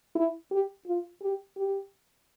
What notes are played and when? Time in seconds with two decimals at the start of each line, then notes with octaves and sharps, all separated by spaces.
0.15 E4
0.51 G4
0.87 F4
1.22 G4
1.57 G4